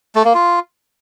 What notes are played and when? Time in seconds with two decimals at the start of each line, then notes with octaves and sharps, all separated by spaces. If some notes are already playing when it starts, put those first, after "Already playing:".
0.16 A3
0.25 A#3
0.34 F4